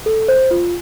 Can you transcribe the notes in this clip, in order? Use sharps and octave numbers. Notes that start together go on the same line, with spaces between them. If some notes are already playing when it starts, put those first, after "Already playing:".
A4
C5
F4